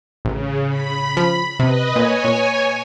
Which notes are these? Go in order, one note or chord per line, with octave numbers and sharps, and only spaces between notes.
A1 C#3
B5
F3
C3 B4 D#5
A#2 C#5 G#5
A#2